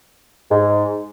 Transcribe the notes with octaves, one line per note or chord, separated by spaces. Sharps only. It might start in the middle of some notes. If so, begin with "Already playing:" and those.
G#2